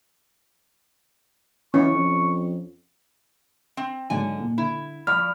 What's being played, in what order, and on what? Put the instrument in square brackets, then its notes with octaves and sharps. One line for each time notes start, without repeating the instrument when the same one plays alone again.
[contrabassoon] E3 [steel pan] C#4 [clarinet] C#6
[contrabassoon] F2
[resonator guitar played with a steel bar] C4
[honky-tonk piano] G#2 F#3 D4 [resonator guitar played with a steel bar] D3 G#5
[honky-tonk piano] A#2
[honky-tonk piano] D3 [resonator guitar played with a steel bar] E4
[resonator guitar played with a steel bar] F3 [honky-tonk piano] D5 B5 C#6 [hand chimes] F6